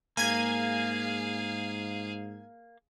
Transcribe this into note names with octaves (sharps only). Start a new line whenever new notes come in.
G#2 A#3 G#4 F5 G#5 G#6